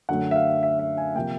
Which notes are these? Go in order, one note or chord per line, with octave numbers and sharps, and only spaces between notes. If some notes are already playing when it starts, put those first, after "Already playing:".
F#2 D3 F#3 A3 C#4 F#5
E5
F5
E5
E5
G#5
C3 F3 A#3 G5